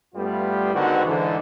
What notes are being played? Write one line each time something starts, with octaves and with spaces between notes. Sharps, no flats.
G2 G3 A3 B3 F4
G#2 D3 D#3 B3 C4 F#4
G#2 D3 E3